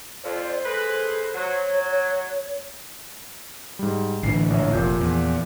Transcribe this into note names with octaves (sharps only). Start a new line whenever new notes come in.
F2 C5 D5
G#3 A4 B4
F#3 C#5
G#2 G3
A1 D3 E3 C7
A#1 C#5
F1 A#2 F3 G6
E2